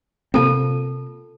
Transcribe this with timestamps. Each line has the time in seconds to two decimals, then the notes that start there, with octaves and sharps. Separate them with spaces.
0.34 C3 A#3 C4 F4 A4 A5